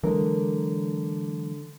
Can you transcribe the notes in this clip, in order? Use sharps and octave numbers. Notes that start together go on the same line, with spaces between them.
D3 E3 F#3 G#3 A#4